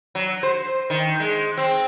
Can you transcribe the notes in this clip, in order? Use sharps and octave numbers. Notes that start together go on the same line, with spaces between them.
F#3
C5
D#3
G#3
C4